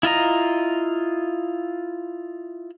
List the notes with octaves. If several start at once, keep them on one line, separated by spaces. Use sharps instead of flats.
E4 F4 D#5 A#5